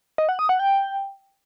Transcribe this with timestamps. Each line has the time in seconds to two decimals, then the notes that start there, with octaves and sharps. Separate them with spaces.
0.18 D#5
0.29 F#5
0.39 D#6
0.49 F#5
0.60 G5